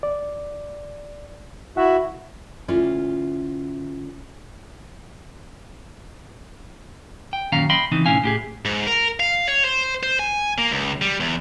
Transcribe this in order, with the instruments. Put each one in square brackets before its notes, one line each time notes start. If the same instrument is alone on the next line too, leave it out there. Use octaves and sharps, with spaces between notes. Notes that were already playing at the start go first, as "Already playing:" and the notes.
[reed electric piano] D5
[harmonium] E4 F#4 E5 [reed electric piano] F#5
[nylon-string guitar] D2 C#4 E4 F4 D5
[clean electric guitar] G5
F#2 A#2 D#3 C#4 F5 A#5
D#5 F5 G5 B5 C6
C#3 E3 C4 D#4
A2 C3 C#4 E4 F5 G#5
A2 G4 G#4
[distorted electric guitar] G#2
A#4
F5
C#5
C5
C5
G#5
A#3
C#2
G3
E2